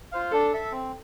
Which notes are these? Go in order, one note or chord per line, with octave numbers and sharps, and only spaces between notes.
F4 C5 F5
D4 A4
A4 E5
C4